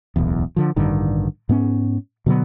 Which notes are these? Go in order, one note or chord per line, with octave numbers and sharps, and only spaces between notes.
D1 B1 E2
D3 F3
A1 G2 D3 D#3
G#2 B3 C#4
B2 D3 F#3 B3